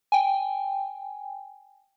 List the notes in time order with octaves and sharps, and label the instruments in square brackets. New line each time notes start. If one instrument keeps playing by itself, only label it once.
[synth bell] G5 G#5